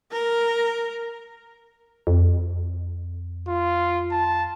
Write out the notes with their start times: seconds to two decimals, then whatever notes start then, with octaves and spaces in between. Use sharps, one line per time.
0.12 A#4
2.07 F2
3.48 F4
4.11 A5